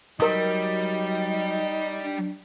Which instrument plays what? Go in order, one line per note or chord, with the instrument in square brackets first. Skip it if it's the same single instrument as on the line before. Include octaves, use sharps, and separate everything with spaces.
[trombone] F#3 [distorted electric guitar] G3 [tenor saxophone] D#4 [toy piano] A#4 D#6
[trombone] D4